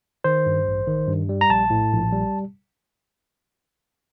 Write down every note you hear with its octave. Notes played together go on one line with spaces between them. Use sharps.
D#3 C5
G2
A1
D#3
G2
G3
A#5
A#1 A5
A2
A#1
G3